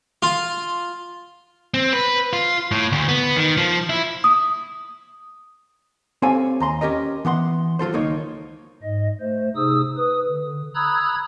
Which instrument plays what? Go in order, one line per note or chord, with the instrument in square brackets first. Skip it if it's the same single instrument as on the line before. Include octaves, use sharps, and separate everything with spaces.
[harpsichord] F4
[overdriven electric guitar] C4
B4
F4
A2
D2
B3
D#3
F3
E4
[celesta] D#6
[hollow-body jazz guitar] C4 G4 A4 C#5 F5 G#5
D#2 A#5 C6
C#4 G4 A#4 D#5
E3 B3 F#5 C6
F#3 F4 A4 C5
C#2 D#3 A#3 D#4 C#5
[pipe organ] G#2 D#5
A3 C5
C3 D#4 G#4 D#6 E6
B4 D#6
D3
A#5 B5 D#6 E6 F#6 G#6